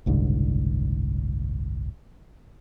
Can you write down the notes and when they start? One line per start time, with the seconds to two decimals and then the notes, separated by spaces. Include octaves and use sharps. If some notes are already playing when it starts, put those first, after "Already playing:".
0.06 F#1 C2 G#2 D3